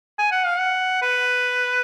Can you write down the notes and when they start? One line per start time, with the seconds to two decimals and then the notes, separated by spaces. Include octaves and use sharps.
0.19 G#5
0.32 F#5
0.45 F5
0.59 F#5
1.02 B4